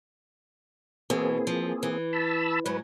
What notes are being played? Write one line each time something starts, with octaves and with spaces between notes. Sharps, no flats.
B2 E3 A#3 C4 G#4
F3
E3
A5 B5 E6
G#2 F#3 B4